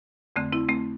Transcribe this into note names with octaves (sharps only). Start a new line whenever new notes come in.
F2 D3 A3 C4
C4 E4
A3 C4